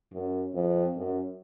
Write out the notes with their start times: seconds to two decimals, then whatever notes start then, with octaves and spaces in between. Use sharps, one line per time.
0.12 F#2
0.54 F2
0.96 F#2